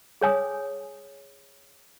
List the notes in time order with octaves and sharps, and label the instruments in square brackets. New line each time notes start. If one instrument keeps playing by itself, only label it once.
[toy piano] G#4 C#5 G#5 D#6